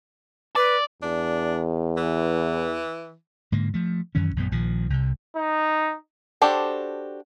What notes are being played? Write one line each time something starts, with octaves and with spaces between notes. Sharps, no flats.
B4 D5
E2 D4
E3
G#2 D3 A#3
F3 A3
F#2 D#3 E3 C#4
A1 F#2 A#2 B3
A#1 D#3 F3
C2 C3
D#4
D4 F#4 G4 A4 C5